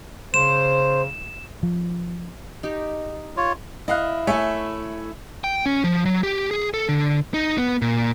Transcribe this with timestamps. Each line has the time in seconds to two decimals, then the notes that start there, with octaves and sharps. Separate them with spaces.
0.34 C#3 C5 E7
1.63 F3
2.63 D#4 G4
3.37 F4 C#5
3.88 E4 D#5 F5 F#6
4.27 A3 E4 C#5 E5 G#5
5.44 G5
5.66 C#4
5.84 F3
6.05 F#3
6.23 G4
6.51 G#4
6.74 A4
6.89 D3
7.34 D#4
7.58 B3
7.82 A#2